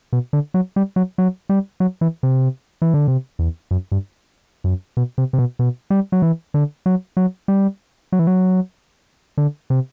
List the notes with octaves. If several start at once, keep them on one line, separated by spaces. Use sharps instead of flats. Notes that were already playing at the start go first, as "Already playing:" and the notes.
B2
D3
F#3
G3
F#3
F#3
G3
F#3
E3
C3
E3
D3
C3
E2
F#2
G2
F#2
B2
C3
C3
B2
B2
G3
F#3
E3
D3
F#3
F#3
G3
F#3
E3
F#3
D3
C3